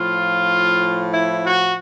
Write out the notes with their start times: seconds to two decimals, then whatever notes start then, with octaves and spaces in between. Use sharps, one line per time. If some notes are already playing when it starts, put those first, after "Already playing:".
Already playing: A2 F3 F4
1.12 E4
1.44 F#4